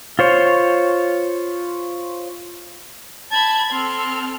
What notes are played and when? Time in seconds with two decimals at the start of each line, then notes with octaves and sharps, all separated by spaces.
0.19 F4 C5 C#5
3.32 A5 B5 G#6
3.72 C4 A4 C6 F6